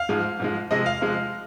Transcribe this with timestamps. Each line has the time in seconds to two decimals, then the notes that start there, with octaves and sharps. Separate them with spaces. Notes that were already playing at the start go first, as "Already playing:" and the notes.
Already playing: F5
0.09 G#2 F3 G#3
0.40 G#2 F3 G#3
0.71 C3 F3 G#3 D#5
0.86 F5
1.01 C3 F3 G#3